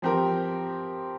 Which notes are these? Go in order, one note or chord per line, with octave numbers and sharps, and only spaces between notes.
F3 C4 G4 A#4